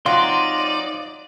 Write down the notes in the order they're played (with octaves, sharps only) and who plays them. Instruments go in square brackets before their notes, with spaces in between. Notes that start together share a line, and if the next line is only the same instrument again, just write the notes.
[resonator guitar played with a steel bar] F#3 C4 F4 [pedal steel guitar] D#4 C6 [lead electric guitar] D5 [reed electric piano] F5